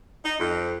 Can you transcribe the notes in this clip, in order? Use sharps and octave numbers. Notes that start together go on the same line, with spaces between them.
D#4
F2